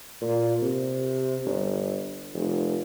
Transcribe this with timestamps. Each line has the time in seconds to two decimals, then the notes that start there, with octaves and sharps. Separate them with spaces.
0.22 A#2
0.62 C3
1.46 G1
2.34 F1